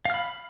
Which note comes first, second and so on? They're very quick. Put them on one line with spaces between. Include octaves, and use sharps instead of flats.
F5 F6 B5